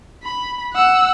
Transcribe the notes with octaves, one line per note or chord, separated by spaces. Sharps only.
B5
F#5 E6